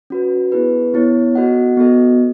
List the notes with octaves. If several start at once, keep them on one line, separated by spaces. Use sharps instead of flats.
C#4 F#4 B4
B3 E4 G#4 B4
B3 E4 A4 C#5
B3 F#4 A4 D#5 F#5
B3 F#4 A4 D#5